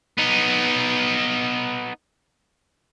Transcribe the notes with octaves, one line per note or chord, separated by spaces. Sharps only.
B3 D#4